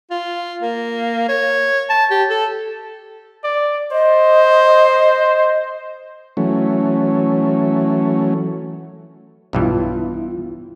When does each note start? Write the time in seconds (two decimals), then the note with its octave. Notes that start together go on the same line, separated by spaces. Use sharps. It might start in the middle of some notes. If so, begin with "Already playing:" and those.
0.10 F4
0.62 A#3
1.28 C#5
1.89 A5
2.10 G4
2.30 A4
3.44 D5
3.92 C5 D#5
6.37 E3 F#3 A3 C#4
9.53 B1 G2 E3 B3 E4 F4